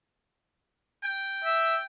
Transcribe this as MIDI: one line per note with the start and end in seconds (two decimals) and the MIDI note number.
1.04 1.84 79
1.45 1.80 76